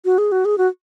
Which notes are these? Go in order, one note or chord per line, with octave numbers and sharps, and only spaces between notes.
F#4
G#4
F#4
G#4
F#4